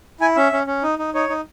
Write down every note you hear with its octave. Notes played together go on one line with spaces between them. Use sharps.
E4 G#5
C#4 E5
C#4
C#4
D#4
D#4
D#4 C#5
D#4